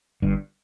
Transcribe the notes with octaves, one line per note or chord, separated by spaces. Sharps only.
G1 G2